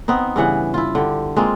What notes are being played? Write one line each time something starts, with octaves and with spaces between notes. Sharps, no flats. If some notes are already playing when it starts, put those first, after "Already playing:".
B3 C4 D#4
G2 C#3 E3 F#5
E4 F4
D3 G4
G#3 A#3 C4 F4